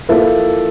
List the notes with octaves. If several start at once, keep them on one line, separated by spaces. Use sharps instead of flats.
F3 A#3 E4 A4 E5